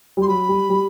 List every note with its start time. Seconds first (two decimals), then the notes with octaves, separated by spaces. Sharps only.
0.17 G3 C6
0.28 F#3 B5
0.49 G3
0.69 G3